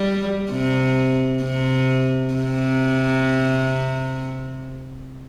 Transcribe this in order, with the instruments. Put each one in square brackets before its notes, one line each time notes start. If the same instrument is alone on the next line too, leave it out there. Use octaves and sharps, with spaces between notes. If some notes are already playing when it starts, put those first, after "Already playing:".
Already playing: [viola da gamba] G3
C3
C3
C3